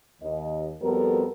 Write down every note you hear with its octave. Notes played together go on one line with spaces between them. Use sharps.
D#2 D#5
F2 G3 B3 F#4 A4 A#4